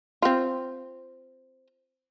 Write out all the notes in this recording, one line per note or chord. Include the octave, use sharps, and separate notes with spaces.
C4 F4